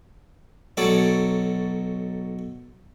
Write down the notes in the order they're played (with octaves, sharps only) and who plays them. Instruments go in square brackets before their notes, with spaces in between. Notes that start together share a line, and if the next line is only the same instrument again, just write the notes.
[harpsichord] B1 F#3 A4 C#5 D5 A5